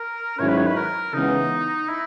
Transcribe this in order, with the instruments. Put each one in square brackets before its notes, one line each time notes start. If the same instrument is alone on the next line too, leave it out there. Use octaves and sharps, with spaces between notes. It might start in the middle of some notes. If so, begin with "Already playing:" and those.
Already playing: [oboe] A#4
[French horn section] G#2 D#3 F#3 C#4 E4 [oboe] C#5
[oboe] B4
C#5
B4
A#4
[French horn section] C#3 E3 G#3 B3 [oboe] D#4
[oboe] E4